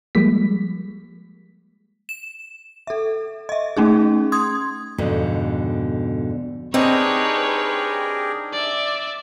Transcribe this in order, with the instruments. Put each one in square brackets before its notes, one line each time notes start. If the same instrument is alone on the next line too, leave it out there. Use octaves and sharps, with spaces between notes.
[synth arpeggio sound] F3 G3 G#3 A#3 B6
[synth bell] E7
A4 E5
D#5 E5
A3 C#4 D#4 G#4
C6 D#6 G#6
[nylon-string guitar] F2 G#2 B2 D3
[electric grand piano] C4 [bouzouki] D4 D#4 [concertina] G4 G#4 A#4 [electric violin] B4 C#5
[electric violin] D5 E5